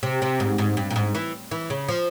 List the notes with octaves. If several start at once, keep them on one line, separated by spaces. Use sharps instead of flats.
C3
C3
G#2
G#2
G2
A#2
G#2
E3
E3
C#3
F3